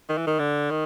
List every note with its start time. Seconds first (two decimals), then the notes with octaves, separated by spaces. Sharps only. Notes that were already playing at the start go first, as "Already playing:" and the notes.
0.09 D#3
0.18 E3
0.27 D#3
0.39 D3
0.70 D#3